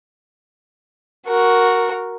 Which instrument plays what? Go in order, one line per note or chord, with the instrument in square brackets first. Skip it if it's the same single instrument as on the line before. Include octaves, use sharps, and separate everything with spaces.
[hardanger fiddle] F#4 A#4